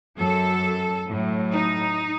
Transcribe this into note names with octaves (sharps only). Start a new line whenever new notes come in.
F#2 F#3 A4
A2 F#3
D#4